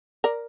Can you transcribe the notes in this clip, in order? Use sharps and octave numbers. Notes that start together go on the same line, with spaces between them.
A#4 D5